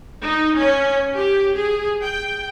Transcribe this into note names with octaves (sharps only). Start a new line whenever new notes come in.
D#4
C#4
G4
G#4
G5